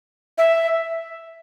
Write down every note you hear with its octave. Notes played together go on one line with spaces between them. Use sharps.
E5